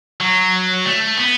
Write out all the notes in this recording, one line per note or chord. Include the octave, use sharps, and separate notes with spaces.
F#3
A3
B3